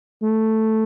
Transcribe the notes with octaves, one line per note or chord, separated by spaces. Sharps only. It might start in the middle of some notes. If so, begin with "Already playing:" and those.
A3